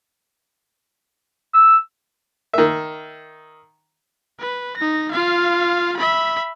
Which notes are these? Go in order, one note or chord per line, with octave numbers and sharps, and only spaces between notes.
E6
D#3 E5
B4
D#4 A#6
F4 F5
E5 B5